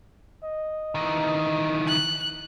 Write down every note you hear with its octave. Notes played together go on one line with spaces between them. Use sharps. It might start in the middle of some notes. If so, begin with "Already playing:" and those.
D#5
D#3 E3
F#6